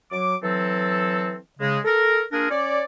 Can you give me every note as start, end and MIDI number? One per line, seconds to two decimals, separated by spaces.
0.11 0.36 54
0.11 0.36 86
0.43 1.36 52
0.43 1.36 54
0.43 1.36 60
0.43 1.36 69
1.59 1.79 49
1.59 1.79 56
1.85 2.23 69
1.85 2.23 70
2.32 2.47 58
2.32 2.47 62
2.32 2.47 65
2.32 2.47 68
2.32 2.47 70
2.50 2.82 61
2.50 2.82 73
2.50 2.82 74